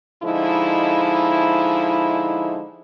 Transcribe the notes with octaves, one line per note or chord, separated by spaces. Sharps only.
D3 F3 G#3 D#4 E4